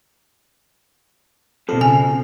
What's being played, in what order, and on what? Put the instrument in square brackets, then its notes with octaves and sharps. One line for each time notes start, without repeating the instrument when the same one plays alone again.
[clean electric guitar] F2 F3 [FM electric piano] B2 A4
[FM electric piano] C#3 [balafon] G#5